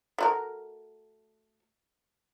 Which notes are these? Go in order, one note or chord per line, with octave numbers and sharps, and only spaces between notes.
A3 F#4 A#4